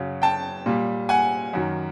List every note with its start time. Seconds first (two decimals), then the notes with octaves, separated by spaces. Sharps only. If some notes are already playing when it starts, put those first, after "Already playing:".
Already playing: F#2 C#3 F#3
0.22 G5 A5
0.66 A#2 G3
1.09 F#5 G#5
1.54 F#2 D#3 F#3